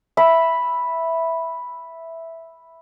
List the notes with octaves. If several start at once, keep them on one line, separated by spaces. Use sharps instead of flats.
E5 B5